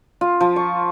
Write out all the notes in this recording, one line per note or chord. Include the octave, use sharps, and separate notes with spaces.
F4
F3
C#6